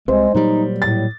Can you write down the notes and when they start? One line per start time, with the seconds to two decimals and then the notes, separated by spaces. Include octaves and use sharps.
0.08 C2 C3 G#3 C5
0.35 A#2 F#3 G3 D#4
0.82 A2 A6